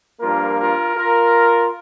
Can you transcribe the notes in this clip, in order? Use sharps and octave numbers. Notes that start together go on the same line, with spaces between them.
G2 F3 A#3 F4 A#4
F4 A#4
F4 A#4